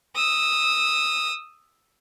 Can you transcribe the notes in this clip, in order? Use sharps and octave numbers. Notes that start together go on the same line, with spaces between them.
D#6 E6